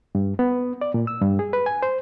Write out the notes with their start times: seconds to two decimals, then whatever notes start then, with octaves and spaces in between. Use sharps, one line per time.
0.15 G2
0.39 B3
0.81 D5
0.94 A#2
1.07 E6
1.22 G2
1.39 G#4
1.53 B4
1.66 G#5
1.83 C5